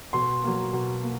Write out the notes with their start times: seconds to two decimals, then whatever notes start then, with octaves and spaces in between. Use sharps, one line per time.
0.13 B2 C6
0.44 F#3 A#3
0.73 B2
1.03 A#3